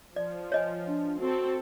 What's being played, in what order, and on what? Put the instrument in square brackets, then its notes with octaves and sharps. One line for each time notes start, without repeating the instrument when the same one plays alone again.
[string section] F3 [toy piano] D5
[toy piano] C#5 D#5 G#5
[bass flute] D4
[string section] C4 A4 [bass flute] F#4